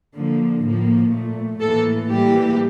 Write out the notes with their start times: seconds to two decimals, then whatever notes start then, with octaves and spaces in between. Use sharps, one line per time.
0.16 D3 F3 A#3
0.65 A2 F3 A#3
1.12 A#2 A3
1.61 A2 E3 A#3 A4
2.09 A2 E3 G3 A#3 G4